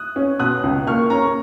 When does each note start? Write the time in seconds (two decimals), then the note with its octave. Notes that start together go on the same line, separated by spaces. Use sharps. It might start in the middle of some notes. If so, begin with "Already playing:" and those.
Already playing: D#6 F#6
0.16 C#4
0.39 B2 D#6 F#6
0.63 C#2
0.87 A#3 C#6 F6
1.10 C#4 A#5 C#6